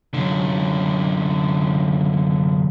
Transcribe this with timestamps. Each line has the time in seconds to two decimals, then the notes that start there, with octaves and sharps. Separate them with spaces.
0.14 F#2 D3